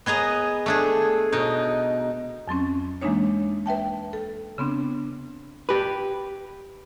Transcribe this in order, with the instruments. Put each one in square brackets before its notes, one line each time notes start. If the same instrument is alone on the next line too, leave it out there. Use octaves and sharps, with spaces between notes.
[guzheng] B3 G#4 D#5 A#5
A3 D4 G#4
B2 D#4
[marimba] F2 F#3 C4 C#4
E3 G#3 A#3 D4 D#4 C#5
B4 E5 G5 A5
A4
C#3 B3 C4 D4
[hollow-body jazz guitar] G4 B4